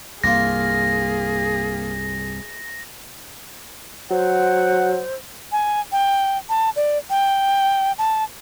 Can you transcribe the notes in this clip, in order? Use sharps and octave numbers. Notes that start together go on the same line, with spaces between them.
C2 G2 A#3 F4 G#4 A#6
F#3 C5 F#5
G#5
G5
A5
D5
G5
A5